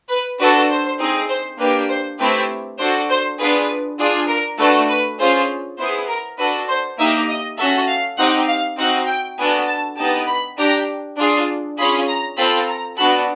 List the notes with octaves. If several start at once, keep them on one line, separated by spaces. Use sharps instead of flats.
B4
D4 F#4 A4 B4
C5
C4 D#4 G#4
C5
A#3 D4 G4 B4
C5
A3 C4 E4 G4 B4
D4 F#4 A4 C5
C5
B3 D4 F4 G#4 B4
D4 F4 G#4
A#4
A3 D4 F#4 A4 B4
B4
C#4 F4 G#4 C5
B3 E4 G#4 C5
A#4
D4 F#4 A4 B4
C5
A#3 D#4 G4 E5
D#5
C#4 F#4 A4 E5
F5
C4 D#4 G4 F#5
F5
C4 D#4 F#4 F#5
G5
B3 D4 F#4 A4 G#5
A5
B3 D#4 G4 A5
B5
D4 G4 A#5
D4 F4 G#4
C#4 F4 G#4 B5
A#5
C4 F4 A4 B5
A#5
B3 D4 F#4 A4 B5